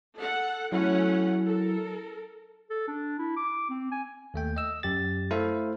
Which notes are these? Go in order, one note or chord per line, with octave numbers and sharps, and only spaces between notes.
A4 F#5
F#3 A3 C#4 E4 F#5
A4 A#4
A4
D4
E4
D6
C4
G#5
D#2 A3 G5
D#5 E6
F#2 G4 A6
A3 E4 A4 C5 F5